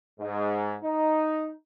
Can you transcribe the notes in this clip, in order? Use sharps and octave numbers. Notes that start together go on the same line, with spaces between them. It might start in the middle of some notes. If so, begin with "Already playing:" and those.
G#2
D#4